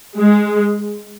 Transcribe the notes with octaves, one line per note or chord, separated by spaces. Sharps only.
G#3